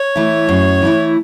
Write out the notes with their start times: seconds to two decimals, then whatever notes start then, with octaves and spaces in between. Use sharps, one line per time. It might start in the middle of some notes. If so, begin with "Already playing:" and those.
Already playing: C#5
0.16 E3 A3 E4
0.49 F#2
0.82 E3 A3 E4